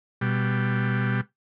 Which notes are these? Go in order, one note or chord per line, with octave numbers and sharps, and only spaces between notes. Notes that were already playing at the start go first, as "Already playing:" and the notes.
B2 G3